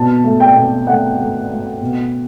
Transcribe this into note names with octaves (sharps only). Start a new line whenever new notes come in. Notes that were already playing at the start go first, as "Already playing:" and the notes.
Already playing: B2 A5
A3
G5
B2
A3 F#5
A3
A3
B2